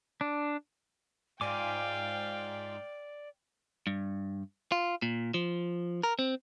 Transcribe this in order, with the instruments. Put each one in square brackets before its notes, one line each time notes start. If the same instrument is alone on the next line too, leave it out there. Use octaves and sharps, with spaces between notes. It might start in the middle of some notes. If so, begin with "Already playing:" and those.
[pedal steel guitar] D4
[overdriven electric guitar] G#2 [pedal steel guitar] F4 G#5 D6 [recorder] D5 [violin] F5 G5
[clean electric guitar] G2
F4
A#2
F3
A#4
C4